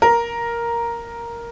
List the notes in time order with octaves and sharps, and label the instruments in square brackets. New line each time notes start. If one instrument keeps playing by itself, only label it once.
[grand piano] A#4